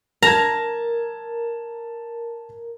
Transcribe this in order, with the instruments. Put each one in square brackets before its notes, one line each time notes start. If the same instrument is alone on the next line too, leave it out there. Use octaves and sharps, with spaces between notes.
[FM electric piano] A#4 [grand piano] A5 G#6 [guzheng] A#5